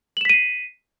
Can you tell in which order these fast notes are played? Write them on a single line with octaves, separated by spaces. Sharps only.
F#7 E7 B6 D#7 C7